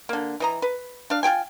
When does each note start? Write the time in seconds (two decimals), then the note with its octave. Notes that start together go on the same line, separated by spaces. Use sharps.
0.09 D3 A#3
0.40 E3 D#5 A#5
0.62 B4
1.10 D4 F5
1.23 F4 G4 G5 G#5